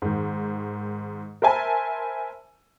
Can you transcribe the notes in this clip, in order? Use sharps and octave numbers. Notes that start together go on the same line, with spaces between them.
G#2 D#3
A#4 C5 E5 G#5 A5 B5